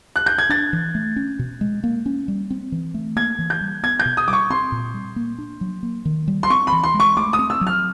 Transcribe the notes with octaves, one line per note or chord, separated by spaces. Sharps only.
F#6
G6
G#6
D4 A6
E3
A3
C#4
B2
G#3
A#3
C#4
G3
C4
E3
A3
A#3 G#6
E3
G6
G3
B3 G#6
G6
B2
D#6
G3 D6
C#6
C4 C6
A#2
G3
A#3
D4
F#3
A#3
D#3
G3
C6
C4 C#6
B5
E3
C6
G#3
C#6
A3 D6
D#6
C4
E6
F#3
F6